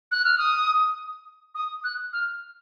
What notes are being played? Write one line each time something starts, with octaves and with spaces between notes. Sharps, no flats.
F#6
F6
D#6
D#6
F#6
F6